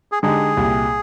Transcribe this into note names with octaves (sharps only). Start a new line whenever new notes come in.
G#4
D3 G#3 D#4 G4 G#4
C2 A#2 G3